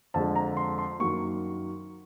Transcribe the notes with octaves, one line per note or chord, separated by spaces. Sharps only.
F2 D3 F3 G#3 A5
A#5
C6
C6
F#2 D#3 F#3 A#3 C#6